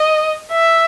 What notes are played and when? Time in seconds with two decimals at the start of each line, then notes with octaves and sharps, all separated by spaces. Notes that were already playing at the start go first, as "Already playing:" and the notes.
Already playing: D#5
0.52 E5